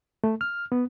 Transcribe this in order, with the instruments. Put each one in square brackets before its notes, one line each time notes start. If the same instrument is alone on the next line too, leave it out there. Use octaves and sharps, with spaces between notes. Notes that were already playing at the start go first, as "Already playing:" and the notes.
[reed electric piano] A3
F6
B3